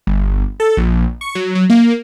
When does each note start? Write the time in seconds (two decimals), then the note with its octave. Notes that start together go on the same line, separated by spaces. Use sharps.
0.07 G1
0.60 A4
0.77 A#1
1.21 C#6
1.35 F#3
1.55 F#3
1.70 A#3